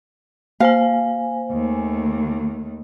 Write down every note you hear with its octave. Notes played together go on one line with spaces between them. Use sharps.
A#3 C5 F5 G#5
D#2 A3